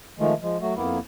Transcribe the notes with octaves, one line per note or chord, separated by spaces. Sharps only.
D#3 F3 G#3 A3
F3 G#3
F#3 A3 F#4
F2 A#3 B3 E4